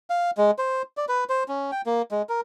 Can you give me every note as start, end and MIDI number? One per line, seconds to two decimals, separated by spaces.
0.10 0.31 77
0.37 0.51 56
0.58 0.82 72
0.97 1.05 74
1.09 1.24 71
1.29 1.44 72
1.48 1.71 61
1.72 1.82 79
1.86 2.02 58
2.11 2.22 56
2.29 2.41 70